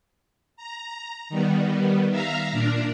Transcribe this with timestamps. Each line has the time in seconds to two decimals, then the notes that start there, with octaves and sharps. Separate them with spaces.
0.57 A#5
1.29 D#3 G3 B3
2.10 E5 F5 A#5
2.51 A#2 D4 A#4